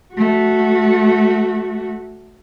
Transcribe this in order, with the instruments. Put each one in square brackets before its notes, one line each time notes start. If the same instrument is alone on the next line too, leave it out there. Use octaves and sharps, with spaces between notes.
[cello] A3 F#4